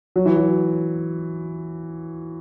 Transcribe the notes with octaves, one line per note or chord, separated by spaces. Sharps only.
F#3
E3
F#3